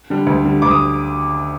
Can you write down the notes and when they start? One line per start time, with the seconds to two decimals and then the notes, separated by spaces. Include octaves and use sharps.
0.10 D3 G3
0.27 D2
0.45 D3 G3
0.62 D2 D6
0.71 D#6